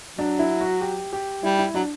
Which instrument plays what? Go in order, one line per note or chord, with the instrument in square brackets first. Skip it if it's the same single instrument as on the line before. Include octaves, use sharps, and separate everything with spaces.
[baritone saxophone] F#3 [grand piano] D4
[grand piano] E4
F#4
G4
G4
[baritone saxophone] G3 [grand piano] E4
[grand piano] E4
[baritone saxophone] F#3 [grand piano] D4